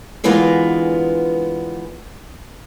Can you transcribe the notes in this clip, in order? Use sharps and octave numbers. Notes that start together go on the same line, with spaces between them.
D3 E3 G#3 B3 F4 A#4